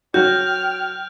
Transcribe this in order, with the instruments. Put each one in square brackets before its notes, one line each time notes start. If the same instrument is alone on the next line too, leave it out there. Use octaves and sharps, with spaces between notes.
[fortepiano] F#3 F#4 [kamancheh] G5 F6 [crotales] G6